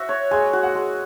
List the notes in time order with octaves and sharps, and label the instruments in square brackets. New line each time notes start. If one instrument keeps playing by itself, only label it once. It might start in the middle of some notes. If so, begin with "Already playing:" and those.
Already playing: [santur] F#4 E5 [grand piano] C5
[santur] C#5
[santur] G#3 [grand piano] G#5
[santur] F#4
[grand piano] F#5
[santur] G#3